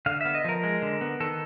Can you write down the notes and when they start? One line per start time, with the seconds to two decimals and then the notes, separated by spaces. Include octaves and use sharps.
0.06 D3 F5
0.21 B3 E5
0.35 D#5
0.45 F3 A#4
0.63 G#3
0.82 D3
1.01 B3
1.20 D#3 A4